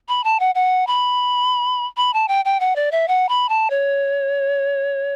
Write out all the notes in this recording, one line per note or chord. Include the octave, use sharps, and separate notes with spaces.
B5
A5
F#5
F#5
B5
B5
A5
G5
G5
F#5
D5
E5
F#5
B5
A5
C#5